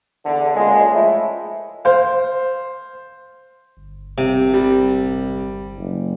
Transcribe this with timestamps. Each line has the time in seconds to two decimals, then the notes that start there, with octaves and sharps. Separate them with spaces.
0.25 E2 D3
0.55 C#2 A#2 G#3
0.92 A2 F3 G#3 A3 E4
1.85 C5 F5
3.77 G1
4.18 C2 C3
4.54 G3
5.77 F#1